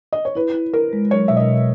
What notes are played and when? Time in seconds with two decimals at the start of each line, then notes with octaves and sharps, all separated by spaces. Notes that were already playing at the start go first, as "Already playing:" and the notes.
0.13 D#5
0.25 C#5
0.35 E4 B4
0.54 E4
0.73 E4 A#4
0.93 G#3
1.11 F#3 C#5
1.28 B2 E5
1.37 D#5
1.48 B2